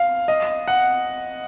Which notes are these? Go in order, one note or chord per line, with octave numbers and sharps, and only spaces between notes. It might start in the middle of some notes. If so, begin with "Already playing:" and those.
Already playing: F5
D#5
F#5